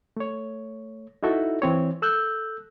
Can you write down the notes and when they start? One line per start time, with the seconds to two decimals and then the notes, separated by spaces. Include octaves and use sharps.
0.17 A3 C#5
1.23 D#4 E4 F#4 A4 E5
1.62 E3 C4 C#5
2.02 A4 E6 F#6 G6